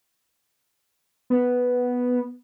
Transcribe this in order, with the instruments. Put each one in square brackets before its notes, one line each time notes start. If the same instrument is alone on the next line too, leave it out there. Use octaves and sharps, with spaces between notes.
[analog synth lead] B3